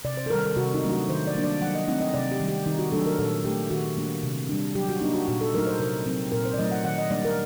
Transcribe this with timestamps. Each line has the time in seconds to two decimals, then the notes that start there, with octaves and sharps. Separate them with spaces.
0.05 C3 D5
0.17 C5
0.26 A4
0.30 D#3 G3 A#4
0.44 A4
0.57 C3 F#4
0.74 D#4
0.83 F#3 A3 D4
0.91 F#4
1.09 D#3 C5
1.27 D5
1.35 G3 A#3 D4
1.44 D5
1.61 F#3 F#5
1.75 D#5
1.88 A3 C4 D#4 F#5
2.01 D#5
2.14 C3 D5
2.31 G4
2.40 D#3 G3
2.48 G4
2.66 D#3 D#4
2.79 F#4
2.92 F#3 A3 D4 A4
3.06 A#4
3.18 A#2 A4
3.45 A3 D4 G4
3.70 D#3 F#4
3.97 G3 A#3 D4
4.23 C3
4.49 G3 D4
4.75 F#3 G4
4.89 F#4
5.01 A#3 D4 D#4
5.14 F#4
5.28 A#2 F#4
5.41 A4
5.54 F#3 A3 D#4 A#4
5.67 C5
5.80 C3 A#4
6.06 F#3 C4 D#4
6.32 A#2 A#4
6.45 C5
6.54 D5
6.58 F#3 A3 D#4 D#5
6.71 F#5
6.84 D#3 F#5
6.98 D#5
7.10 G3 A#3 D4 D5
7.25 A#4